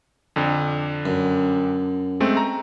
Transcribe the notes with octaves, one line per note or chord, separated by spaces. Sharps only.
F2 D3
F#2
G#3 A3 C4
A#5